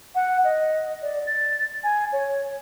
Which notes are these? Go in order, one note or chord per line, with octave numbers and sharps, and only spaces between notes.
F#5
D#5
D5
A6
G#5
C#5